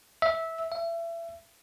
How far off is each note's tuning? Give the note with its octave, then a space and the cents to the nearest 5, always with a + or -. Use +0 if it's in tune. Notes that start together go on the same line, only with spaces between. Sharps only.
E5 -15
E5 +30